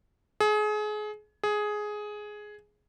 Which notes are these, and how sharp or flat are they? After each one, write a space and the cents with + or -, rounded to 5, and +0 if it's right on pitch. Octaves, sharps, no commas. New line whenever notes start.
G#4 +30
G#4 +10